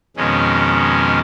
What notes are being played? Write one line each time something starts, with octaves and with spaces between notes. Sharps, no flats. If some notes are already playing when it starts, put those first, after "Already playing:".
F2 B2 D#3 G#3 C#4